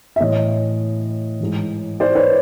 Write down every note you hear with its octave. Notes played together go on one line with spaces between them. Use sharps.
E5
A2 E3 C#5 D#5
G#2 E3
C5 D5
B4 C#5